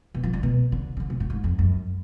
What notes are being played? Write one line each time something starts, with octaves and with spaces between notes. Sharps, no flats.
B2
F3
D3
B2
D3
C#3
D3
B2
A2
G#2
F2
F#2